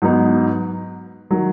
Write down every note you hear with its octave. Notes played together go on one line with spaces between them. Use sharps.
G#2 F#3 B3 D#4
D#3 F#3